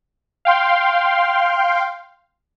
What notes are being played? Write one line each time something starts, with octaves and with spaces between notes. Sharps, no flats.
F5 G5 C6